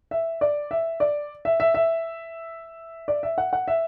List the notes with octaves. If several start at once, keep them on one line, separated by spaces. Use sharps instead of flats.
E5
D5
E5
D5
E5
E5
E5
D5
E5
F#5
F#5
E5